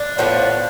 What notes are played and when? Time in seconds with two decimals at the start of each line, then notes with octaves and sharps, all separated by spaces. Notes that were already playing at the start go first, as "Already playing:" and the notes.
Already playing: D4
0.18 A2 F3 B3